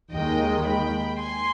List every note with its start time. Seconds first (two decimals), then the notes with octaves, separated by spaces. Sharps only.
0.13 D#2 D#3 G#3 D#5 G5
0.67 G5 B5
1.22 G#5 C6